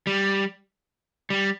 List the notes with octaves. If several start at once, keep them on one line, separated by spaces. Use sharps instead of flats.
G3
G3